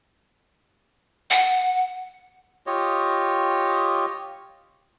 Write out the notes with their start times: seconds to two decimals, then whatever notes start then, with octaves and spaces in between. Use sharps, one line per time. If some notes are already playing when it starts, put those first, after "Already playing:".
1.30 F#5
2.67 F4 G4 C#5 D#5